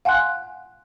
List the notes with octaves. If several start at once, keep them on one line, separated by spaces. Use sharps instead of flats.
F5 F#5 G#5 C6 F#6